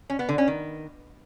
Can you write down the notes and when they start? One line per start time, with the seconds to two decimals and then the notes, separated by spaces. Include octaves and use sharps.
0.10 C#4
0.19 B3
0.29 D3
0.38 C#4
0.48 D#3